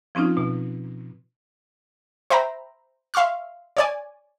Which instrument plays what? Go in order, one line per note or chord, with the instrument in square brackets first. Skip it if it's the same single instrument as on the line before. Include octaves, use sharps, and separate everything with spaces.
[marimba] F3 C4 C#4 D#4 F4
B2
[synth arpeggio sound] C5 E5 G5 A#5 B5
E5 F5 C6 C#6 F6
C#5 D5 G#5